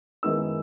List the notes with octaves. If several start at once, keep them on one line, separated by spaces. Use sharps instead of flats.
F#2 D#3 G#3 B3 E4 E6